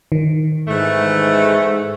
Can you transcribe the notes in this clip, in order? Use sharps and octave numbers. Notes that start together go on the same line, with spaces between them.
D#3
G#2 E3 A3